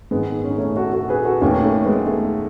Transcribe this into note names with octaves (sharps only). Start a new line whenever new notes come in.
G#2 D#3 G#3 B3
C#4
D#4
A3 C#4
F#4 A4
F#4 A4
G#4 B4
F#4 A4
D#2 D#3 A3 C#4
A3 C#4
G#3 B3
A3